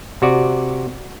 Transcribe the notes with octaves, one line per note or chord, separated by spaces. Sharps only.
C3 F#4 D5